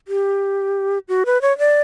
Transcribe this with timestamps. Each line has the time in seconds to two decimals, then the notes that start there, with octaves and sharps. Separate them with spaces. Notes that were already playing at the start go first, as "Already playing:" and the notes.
0.08 G4
1.08 F#4
1.26 B4
1.42 C#5
1.58 D5